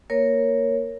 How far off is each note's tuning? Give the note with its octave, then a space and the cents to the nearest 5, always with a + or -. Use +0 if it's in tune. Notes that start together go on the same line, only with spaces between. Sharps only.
A#3 +0 A#4 +0 C#5 +0